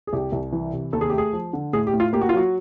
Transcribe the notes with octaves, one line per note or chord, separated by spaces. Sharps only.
G#4
C2 G4
C2
E3
C3
D#2 A4
G#4
A3 G4
G#4
F3
D3
A2 G#4
G4
A2
F4
A#3 G4
F#4
F4
F#3 F#4